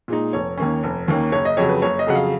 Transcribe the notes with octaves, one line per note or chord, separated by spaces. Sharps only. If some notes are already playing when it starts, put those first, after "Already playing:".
A#2 G#3 D#4
F1 C#5
D#2 D#3 A#3 C#4
F1
D#2 D#3 A#3 C#4
F#1 C#5
D#5
F2 C#3 F#3 C#5
B4
F#1 C#5
D#5
F2 C#3 F#3 F#5
F5